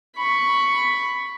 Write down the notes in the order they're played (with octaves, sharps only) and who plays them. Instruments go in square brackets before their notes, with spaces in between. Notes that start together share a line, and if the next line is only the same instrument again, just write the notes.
[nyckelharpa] B5 C#6